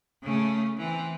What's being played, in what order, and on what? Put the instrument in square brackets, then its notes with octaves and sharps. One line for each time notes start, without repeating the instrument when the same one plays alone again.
[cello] C#3 A3
E3 C4